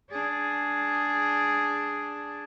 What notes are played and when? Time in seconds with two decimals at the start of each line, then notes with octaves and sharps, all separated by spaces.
0.11 D4 G#4